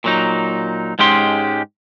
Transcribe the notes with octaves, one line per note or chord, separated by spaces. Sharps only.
A#2 F#3 D#4
G#2 G#3 C#4 G4 C6